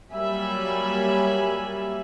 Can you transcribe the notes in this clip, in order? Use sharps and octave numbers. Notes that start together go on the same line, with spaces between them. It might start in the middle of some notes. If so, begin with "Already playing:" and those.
F#3 G3 A#3 E5 G#5 B5